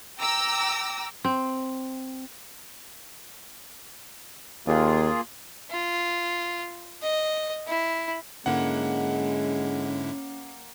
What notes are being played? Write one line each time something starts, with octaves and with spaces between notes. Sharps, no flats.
G5 A#5 D6 E6 A#6
C4
D#2 A#3 F4 G#4
F4
D#5
E4
G#2 D3 G#3 A#3 C#4 E4 F#5